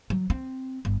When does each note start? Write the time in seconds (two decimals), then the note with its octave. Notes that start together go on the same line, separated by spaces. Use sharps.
0.10 F#3
0.30 C4
0.85 G1